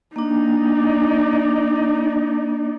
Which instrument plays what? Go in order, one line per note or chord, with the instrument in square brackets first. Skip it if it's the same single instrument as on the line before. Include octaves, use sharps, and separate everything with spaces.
[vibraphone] A#3 D4 [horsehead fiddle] D#4 D5